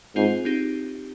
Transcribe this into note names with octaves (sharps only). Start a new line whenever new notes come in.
G#2 C4 F4 G#4 C5
C4 D#4 G4